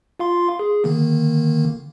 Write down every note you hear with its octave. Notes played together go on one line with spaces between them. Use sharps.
F4 F5 C6
G#4
D3 D#3 A#3